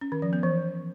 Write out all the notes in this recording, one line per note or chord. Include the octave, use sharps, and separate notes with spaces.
C#4
D#3
F3
B3
E3